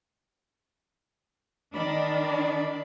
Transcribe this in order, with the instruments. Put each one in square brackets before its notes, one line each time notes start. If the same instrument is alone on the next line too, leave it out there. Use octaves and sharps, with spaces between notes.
[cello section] D#3 D4 [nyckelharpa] D5 B5